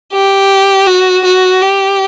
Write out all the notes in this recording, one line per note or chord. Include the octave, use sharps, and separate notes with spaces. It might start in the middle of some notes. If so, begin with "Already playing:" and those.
G4
F#4
F#4
G4